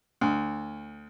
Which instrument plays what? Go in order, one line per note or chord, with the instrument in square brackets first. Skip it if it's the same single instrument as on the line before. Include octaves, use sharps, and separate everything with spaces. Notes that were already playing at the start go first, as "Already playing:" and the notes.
[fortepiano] D2